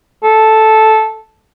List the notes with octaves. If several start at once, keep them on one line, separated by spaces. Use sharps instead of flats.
A4